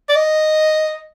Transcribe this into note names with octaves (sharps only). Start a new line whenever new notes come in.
D5
D#5